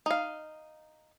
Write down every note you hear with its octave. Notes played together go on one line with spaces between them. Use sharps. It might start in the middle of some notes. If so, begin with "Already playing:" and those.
D#4 F5